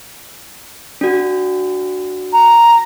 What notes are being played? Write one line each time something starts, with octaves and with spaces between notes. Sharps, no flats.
D4 F#4
A#5